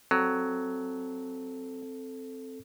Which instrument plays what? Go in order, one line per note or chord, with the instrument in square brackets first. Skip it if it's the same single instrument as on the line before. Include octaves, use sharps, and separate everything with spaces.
[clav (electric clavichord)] F#3 [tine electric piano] C4 A4